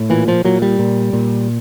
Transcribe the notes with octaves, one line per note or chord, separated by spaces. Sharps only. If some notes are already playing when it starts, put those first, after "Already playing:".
Already playing: A2
A#2 E3
F3
A#2 F#3
G3
A#2
A#2